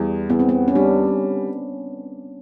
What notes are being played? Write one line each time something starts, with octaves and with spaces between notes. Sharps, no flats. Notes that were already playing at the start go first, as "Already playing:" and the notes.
Already playing: E2 G3
E2 B3
C4
B3
C#4
G3 D4